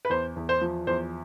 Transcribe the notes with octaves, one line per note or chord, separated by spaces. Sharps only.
B4
E2 C5
E2
C5
F3
E2 C5